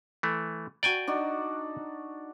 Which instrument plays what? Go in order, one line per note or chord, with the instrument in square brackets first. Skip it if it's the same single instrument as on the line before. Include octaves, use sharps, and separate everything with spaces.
[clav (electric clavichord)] E3 A3
[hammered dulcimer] F#4 A#5 [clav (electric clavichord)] D5 G5 G#5
[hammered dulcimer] D4 D#4 F#4